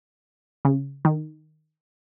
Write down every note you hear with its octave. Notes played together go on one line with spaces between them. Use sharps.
C#3
D#3